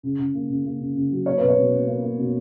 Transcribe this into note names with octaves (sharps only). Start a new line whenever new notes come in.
C#3
C#3
A#3
C#3
A#3
C#3
C#3
F#3
A#3 C#5
B2 B4
C#5
B2
A#3
A#3
A#3
B2